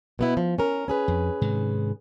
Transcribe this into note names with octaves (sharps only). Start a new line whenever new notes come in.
B2 B3 E4
F3
C#4 A#4
C#4 G#4 B4
F2
G#2 C3 D#3